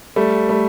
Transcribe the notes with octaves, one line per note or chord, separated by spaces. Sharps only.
G3 A3
G3 A3